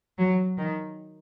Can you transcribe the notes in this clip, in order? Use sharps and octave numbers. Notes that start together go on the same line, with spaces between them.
F#3
D#3